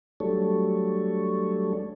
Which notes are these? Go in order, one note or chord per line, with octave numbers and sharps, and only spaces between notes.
F#3 G3 A3 D4 A4 C#5